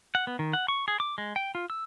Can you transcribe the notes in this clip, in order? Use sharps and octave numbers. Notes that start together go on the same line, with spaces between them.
F#5
B3
D#3
F#5
C#6
G#4
D6
G#3
G5
F4
E6